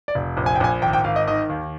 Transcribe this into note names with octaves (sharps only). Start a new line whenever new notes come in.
D5
F1
A#1
G#5
G5
A#1 G#5
G#1 G5
G5
G#1 F5
D#5
D#3 D#5
D#2